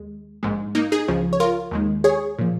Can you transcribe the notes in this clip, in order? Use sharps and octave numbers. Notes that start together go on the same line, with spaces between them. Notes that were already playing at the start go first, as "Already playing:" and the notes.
Already playing: D#2 G#3
A#1 G#2 G#3
A#3 D#4
D#4 G#4
C#2 C#3 F3
C#5
F4 A#4
D#2 D#3 G#3
G#4 C#5
A#2 F3